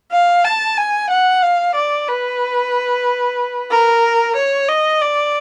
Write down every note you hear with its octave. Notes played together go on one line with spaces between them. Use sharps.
F5
A5
G#5
F#5
F5
D5
B4
A#4
C#5
D#5
D5